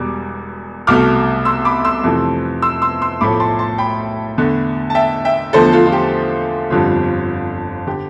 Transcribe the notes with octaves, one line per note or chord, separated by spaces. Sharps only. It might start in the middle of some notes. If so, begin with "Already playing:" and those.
Already playing: E1 E2 B2 G3 D6
C2 B2 A3 D6 F6
C6 E6
B5 D6
C6 E6
F2 C3 E3 A3
C6 E6
C6 E6
C6 E6
B1 A2 F3 A3 B5 D6
A5 C6
A5 C6
G5 B5
E2 D3 A3
A5
E5 G5
E5 G5
E2 D3 F3 A3 A4 C5
F4 A4
F4
G4
G1 F2 D3 G3 F4
D3 G4